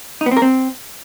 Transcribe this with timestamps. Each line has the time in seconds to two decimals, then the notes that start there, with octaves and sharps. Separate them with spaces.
0.21 D#4
0.26 B3
0.31 C4
0.37 A#4
0.42 C4